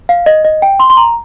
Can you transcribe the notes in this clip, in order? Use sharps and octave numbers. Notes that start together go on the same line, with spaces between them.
F5
D#5
D#5
G5
C6
C6
A#5